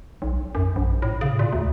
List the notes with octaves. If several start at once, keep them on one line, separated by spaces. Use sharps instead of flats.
B1
F#2
A#1
A2
C#3
A#2
D2